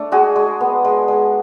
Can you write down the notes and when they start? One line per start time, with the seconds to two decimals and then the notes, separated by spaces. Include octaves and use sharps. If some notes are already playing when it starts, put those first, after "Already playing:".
Already playing: A3 D4
0.12 G#3 F#4 G#4
0.36 G#3
0.61 B3
0.85 G#3
1.08 G#3